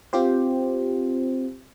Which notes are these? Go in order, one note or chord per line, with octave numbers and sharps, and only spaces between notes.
C4 F4 G4 C5